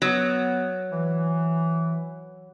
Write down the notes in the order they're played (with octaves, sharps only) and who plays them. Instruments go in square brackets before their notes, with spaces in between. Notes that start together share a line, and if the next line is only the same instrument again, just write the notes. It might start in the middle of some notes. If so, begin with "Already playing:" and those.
[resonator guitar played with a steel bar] F#3 [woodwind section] B3
[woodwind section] E3